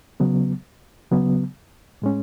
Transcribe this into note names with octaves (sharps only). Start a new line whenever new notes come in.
C#3 F#3 B3
C#3 F#3 B3
A2 G#3 C#4